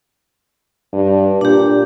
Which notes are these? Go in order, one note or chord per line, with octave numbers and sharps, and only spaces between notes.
G2
A#2 D4 G4